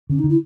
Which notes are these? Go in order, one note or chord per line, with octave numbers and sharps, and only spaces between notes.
D3 C#4
D#4
D3
E4